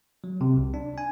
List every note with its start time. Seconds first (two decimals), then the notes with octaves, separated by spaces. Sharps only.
0.24 F#3
0.41 C3
0.57 C2
0.74 D4
0.98 G#5